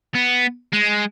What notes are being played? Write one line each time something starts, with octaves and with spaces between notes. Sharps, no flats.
B3
G#3